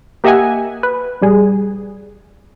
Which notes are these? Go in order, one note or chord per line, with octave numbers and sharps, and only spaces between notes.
A#3 G4 D#5 E5 F#5 G#5
B4
A#1 G3 G#4